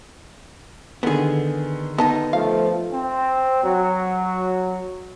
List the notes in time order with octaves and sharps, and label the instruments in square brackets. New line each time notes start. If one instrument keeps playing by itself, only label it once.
[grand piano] D3 D#3 [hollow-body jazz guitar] B3 G#4
[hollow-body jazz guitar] B3 D#4 [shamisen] D#5 A5
[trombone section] F3 A3 [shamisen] F5
[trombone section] C4
F#3